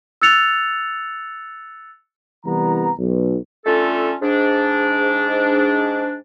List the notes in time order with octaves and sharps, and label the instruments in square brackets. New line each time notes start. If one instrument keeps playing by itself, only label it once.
[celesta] E6 F#6 A6 C#7 F7
[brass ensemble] C2 E3 G3 B3 A#5
B1
[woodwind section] D3 A3 C#4 F4 A4
G#2 D4